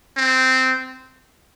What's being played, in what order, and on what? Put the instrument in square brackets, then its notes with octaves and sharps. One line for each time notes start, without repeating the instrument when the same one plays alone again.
[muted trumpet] C4